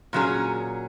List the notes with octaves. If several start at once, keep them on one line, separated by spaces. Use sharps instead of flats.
A#2 F#3 C#4 G#4